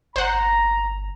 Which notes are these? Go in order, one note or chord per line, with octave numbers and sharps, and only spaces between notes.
G1 C5 F#5 A#5